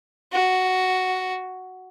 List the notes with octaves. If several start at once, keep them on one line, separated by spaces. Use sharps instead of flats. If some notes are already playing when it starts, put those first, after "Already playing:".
F#4